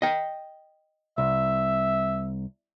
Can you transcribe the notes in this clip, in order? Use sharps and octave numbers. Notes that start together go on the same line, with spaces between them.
D#5 G5
C2 E5